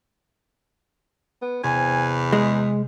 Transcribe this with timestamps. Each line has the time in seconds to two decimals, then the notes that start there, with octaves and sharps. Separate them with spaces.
1.42 B3
1.63 E2 C3 G#5
2.33 G#3 G#4